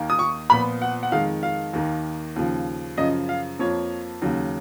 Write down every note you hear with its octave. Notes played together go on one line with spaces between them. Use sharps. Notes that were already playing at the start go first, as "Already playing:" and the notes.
Already playing: D#2 D#3 A#3
D#6
C#6
A#2 F3 B3 B5
F#5
F#5
F2 D#3 G#3 F5
F5
D#2 D#3 A#3
D#2 C#3 F3
F#2 C#3 F3 D#5
F5
F2 F3 A#3 C#5
D#2 C#3 F#3